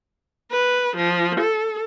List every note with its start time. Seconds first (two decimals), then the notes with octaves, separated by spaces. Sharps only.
0.52 B4
0.97 F3
1.40 A4